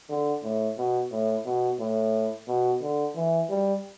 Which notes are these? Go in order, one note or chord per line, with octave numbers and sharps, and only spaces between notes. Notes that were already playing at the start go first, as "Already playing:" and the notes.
D3
A2
B2
A2
B2
A2
B2
D3
E3
G3